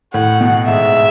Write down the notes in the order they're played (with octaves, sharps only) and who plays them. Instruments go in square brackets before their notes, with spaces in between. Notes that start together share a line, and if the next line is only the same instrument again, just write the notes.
[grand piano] A2 [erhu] F#5
[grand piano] B2
[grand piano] G#2 [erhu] E5